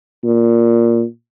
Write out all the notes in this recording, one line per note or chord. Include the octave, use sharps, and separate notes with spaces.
A#2